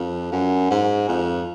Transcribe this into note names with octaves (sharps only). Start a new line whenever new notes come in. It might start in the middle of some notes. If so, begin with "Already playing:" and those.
Already playing: F2
F#2
G#2
F2